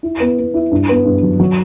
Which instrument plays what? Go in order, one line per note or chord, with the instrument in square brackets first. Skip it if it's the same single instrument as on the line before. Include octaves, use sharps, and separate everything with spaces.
[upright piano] E4
B3
B3
E4
G2
B3
G2
F#3
F#3